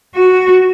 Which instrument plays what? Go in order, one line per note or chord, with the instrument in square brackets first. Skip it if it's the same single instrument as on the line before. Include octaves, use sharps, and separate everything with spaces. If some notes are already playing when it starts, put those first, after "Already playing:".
[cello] F#4